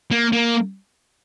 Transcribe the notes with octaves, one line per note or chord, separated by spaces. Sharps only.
A#3
A#3